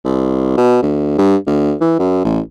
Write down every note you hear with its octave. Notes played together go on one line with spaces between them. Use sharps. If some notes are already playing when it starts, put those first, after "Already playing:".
C2
B2
D2
G2
D2
E3
F#2
A1